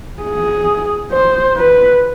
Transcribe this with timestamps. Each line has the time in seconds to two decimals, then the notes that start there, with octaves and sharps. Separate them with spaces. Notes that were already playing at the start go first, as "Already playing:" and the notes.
0.23 G#4
1.12 C5
1.57 B4